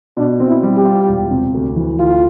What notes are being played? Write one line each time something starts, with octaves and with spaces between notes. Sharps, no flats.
B2 D4
C4
E4
G3
G4
F4
E1
C3
D2
E3
D2 F4